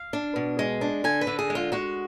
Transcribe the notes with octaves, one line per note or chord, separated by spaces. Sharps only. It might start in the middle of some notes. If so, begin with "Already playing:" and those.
Already playing: F5
D4
B2
G#3
D4
D3 G#5
B4
D3
G#4
G#3
F4
G#3 F#4